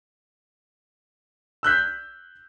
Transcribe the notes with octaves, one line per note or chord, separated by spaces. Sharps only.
E6 F#6 G6 B6